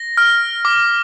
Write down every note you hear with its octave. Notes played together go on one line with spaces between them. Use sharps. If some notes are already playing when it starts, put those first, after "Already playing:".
Already playing: A#6
F6
D6